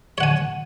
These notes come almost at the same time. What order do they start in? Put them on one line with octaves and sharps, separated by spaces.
C#5 F#5 G#5